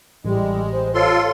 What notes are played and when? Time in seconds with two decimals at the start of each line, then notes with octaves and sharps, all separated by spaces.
0.25 A1 G3 G#3
0.72 C5
0.94 F4 A4 C#5 C6